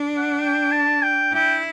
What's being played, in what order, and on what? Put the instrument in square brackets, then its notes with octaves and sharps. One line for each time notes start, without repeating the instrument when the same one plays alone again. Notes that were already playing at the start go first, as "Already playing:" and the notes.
Already playing: [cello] D4
[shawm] F#5
G5
A5
G5
[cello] E4 [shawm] G5